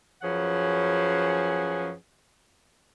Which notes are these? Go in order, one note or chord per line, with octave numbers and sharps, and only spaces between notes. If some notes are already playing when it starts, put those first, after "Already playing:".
F#2 F3 C#4 G#4 B4 F#5